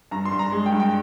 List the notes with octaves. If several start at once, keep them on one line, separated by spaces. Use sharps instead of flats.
G2 A#5
C6
G2
A#5
G#3
G5
G2
G5